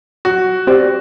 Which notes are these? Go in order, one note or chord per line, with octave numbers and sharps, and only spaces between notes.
F#3 F#4
C4 G4 D5